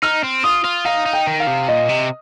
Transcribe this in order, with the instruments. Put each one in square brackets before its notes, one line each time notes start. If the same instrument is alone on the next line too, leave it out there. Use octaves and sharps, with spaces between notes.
[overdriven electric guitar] D#4 [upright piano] F6
[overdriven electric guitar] C4
[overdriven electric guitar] F4 [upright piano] D#6
[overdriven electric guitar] F4
[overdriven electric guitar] D#4 [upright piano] F5
[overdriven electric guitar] D#4
[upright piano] G5
[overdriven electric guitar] D#3
[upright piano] F5
[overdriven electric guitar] C3
[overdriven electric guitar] A#2 [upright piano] D#5
[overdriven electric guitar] C3